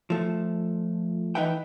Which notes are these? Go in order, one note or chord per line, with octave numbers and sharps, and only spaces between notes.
F3 A3
E3 D#4 B4 E5 F#5 G5